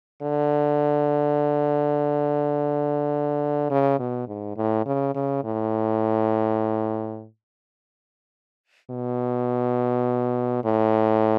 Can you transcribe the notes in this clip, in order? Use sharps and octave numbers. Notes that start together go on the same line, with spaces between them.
D3
C#3
B2
G#2
A2
C#3
C#3
A2
B2
A2